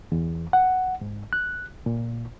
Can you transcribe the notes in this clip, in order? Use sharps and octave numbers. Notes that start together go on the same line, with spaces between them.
E2
F#5
G#2
F#6
A#2